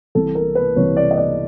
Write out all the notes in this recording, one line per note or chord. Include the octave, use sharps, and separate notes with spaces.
C2 C3 E3 A4
A#4
B4
C2 C3 E3 C#5
D5
D#5
D5